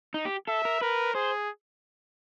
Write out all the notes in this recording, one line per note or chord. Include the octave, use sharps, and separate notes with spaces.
D#4
G4
A4 E5
A#4
A#4 B4
G#4 C5